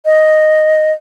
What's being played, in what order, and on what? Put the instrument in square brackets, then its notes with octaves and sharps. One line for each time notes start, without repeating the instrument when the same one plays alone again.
[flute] D#5